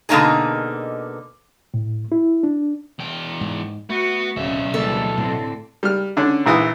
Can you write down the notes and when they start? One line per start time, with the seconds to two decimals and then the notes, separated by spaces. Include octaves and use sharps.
0.09 B2 D3 A#3 C#4 D#4 G#4
1.74 A2
2.12 E4
2.43 D4
2.99 E2 G5
3.41 G#2
3.90 A3 B3 F#4
4.36 D1 B1 C#3 E5
4.74 D2 C#3 E3 G3 A#3 A4
5.17 A2 D3 C4
5.83 G3 F6
6.17 D3 C#4 D4
6.46 A#1 E3 D#6